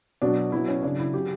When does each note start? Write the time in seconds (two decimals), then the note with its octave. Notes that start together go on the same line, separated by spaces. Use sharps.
0.22 B2 F#3 D4
0.52 B2 F#3 E4
0.68 C#4
0.83 C#3 F#3 D4
0.99 E4
1.14 C#3 F#3 G4